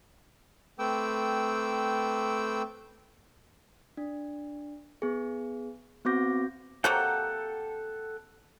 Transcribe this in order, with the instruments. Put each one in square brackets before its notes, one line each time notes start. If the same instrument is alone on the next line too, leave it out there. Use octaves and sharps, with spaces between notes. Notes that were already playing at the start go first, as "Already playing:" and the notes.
[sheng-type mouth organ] A3 C4 B4 G5 D6 E6
[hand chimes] D4
B3 G#4
B3 C4 F#4 D6 G6 A#6
[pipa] C3 F#3 A#3 [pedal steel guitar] A4 F#5 G5